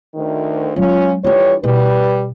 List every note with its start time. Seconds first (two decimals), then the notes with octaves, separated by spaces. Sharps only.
0.15 D2 D#3
0.76 F#3 G#3 C#4 F4
1.24 E3 G3 D4 F4 C#5
1.63 B2 G3 E4 B4